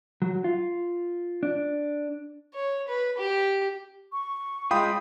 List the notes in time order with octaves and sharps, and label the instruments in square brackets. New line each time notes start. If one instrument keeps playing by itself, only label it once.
[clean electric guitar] F#3
F4
D4
[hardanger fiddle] C#5
B4
G4
[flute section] C#6
[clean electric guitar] G#3 F4 [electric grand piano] G5 B5 D#6